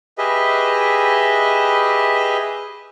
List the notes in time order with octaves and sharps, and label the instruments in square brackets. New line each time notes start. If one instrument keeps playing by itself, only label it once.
[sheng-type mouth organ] G4 G#4 B4 D#5 E5